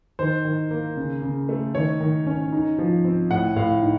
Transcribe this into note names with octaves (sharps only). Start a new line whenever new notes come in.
D#3 C5
D#3
A#3
C#3
C#3
A3
D#3 C#5
D#3
C#4
D#4
F3
C4
A2 F#5
A2 F5
D#4